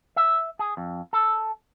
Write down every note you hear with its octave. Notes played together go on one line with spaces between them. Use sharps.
E5
G#4
F2
A4